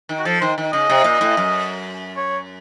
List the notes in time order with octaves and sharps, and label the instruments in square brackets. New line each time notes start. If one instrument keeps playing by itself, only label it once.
[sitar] D#3
[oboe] F#4
[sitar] F3 [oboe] A4
[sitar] D#3 [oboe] C5
[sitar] D#3
[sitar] C#3 [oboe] D#5
[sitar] C3
A#2
A2
F#2
[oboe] C#5